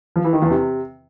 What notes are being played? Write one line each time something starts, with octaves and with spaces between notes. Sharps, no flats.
F3
E3
D#3
E2
C3